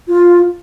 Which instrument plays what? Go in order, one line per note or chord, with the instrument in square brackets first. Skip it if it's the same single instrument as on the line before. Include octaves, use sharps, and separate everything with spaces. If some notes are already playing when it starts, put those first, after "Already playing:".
[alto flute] F4